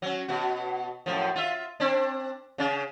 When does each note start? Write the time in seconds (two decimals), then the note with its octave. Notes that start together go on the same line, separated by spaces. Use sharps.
0.02 F#3 C#4
0.28 B2 F#4
1.06 F#2 A2 F3
1.36 F4 E5
1.80 C4 D4
2.58 C#3 C#4